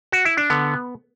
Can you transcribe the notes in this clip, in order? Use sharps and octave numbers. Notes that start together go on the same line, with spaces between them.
F#4
E4
D4
D3 B3